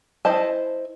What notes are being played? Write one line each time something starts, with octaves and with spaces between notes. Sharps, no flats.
E4 C5 D#5 A5